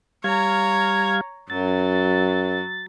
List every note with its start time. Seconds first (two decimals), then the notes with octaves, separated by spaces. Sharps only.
0.24 G3 C#5 F5 A#5 G#6
1.50 F#2 F#3 A6